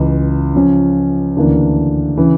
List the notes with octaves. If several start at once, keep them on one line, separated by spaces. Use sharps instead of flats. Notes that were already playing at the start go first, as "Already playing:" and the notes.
Already playing: C#2 C#3 E3
C#3 F3 C#4
D2 C#3 E3 A#3 D4
C#3 E3